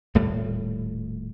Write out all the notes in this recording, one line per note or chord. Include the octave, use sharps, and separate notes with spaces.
D#1 A2 G3 A3